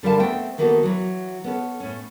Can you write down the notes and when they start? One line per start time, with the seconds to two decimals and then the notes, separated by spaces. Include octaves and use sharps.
0.03 D3 G3 A#4 F5 A5
0.20 A3 B3 C4 G5
0.58 D#3 E3 A#3 B3 F#4 A4
0.83 E3 F#3
1.44 B3 C#4 A4
1.80 A2 C#4